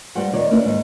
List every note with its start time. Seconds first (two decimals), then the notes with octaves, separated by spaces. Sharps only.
0.15 G2 G3 C5 F#5
0.33 E2 D#3 C#5 D5
0.51 A#3 B3 C#4 D4 E4 B4
0.65 D#2 G#2